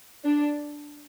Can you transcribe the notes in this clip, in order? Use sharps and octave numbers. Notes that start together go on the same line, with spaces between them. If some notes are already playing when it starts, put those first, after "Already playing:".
D4